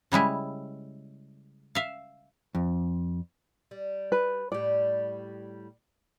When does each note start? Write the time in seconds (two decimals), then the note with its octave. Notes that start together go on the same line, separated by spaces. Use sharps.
0.12 C#3 G3 G#3 E4
1.75 E5 F5
2.55 F2
3.71 G3
4.12 B4
4.52 A2 G3 D5